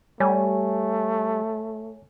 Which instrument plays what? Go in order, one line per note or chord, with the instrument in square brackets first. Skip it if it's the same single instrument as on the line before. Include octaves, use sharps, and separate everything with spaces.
[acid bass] G3 [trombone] A3 [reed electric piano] C#5 G#5